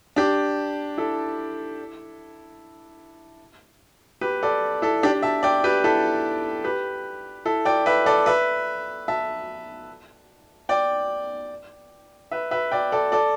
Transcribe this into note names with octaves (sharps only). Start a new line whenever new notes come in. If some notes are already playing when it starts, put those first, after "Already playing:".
D4 G4
E4 A4
G4 B4
A4 D5
E4 A4
D4 G4
E5 A5
D5 G5
G4 B4
E4 A4
G4 B4
E4 A4
D5 G5
B4 E5
A4 D5
B4 E5
E5 A5
D5 G5
B4 E5
B4 E5
D5 G5
A4 D5
A4 D5